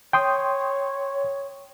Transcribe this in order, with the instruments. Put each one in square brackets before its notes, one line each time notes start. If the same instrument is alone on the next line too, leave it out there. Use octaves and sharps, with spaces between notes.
[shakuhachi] C#5 [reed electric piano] G5 C6 D#6